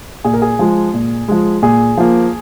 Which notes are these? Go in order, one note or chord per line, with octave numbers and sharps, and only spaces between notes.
A#2 G#4
A#4
G#4
F3 G#3
A#2
F3 G#3
A#2 G#4
F3 A#3